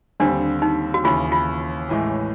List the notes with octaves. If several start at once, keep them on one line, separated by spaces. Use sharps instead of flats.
D#2 D3 G3 C4 D4
D#4
F#4
D#2 C#3 E3 F4
F4
A1 A2 E3 G#3